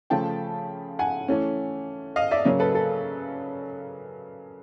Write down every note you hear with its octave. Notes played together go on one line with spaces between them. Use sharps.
C#3 F3 A3 G5 A5
F#5 G#5
E3 A3 C#4
D#5 F5
D5 E5
C#3 F#3 A#3
A4 B4
A4